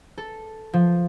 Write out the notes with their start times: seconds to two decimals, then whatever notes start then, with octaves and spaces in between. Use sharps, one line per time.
0.18 A4
0.73 F3